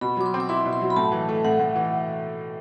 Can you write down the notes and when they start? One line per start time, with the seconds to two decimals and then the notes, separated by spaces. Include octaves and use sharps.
0.01 B2 B5
0.17 F#3 D6
0.26 C6
0.34 C4
0.40 D6
0.49 E4 C6
0.66 B2
0.73 C6
0.81 F#3
0.90 B5
0.96 A2 A5
1.12 E3
1.29 A3
1.44 A2 F#5
1.60 A2
1.76 E3